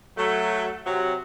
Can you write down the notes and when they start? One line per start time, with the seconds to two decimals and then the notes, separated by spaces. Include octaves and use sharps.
0.18 F#3 A3
0.86 C3 F#3